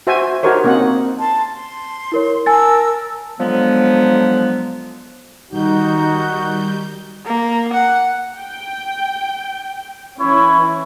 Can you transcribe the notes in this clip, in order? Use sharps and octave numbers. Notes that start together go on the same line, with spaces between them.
F#4 C5 E5 G5 G#5
D#4 F#4 G4 A#4 C5 C#5
A#3 C4 C#4 D#4 F#5
A5 C6
C6
E4 A#4 C#5
A#4 G#5 A5 E6 A6
D3 F3 F#3 G#3 B3
D#3 G3 D#4 F#4 G6
A#3
F#5
G5
E3 C#4 E4 C#5